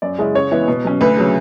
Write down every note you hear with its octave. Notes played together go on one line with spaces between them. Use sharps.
F#2 D5
C#3 G#3 C#4 E4
C#3 C#5
E3 G#3 B3 E4
B2
F#3 C#4
D2 B4
C#3 F#3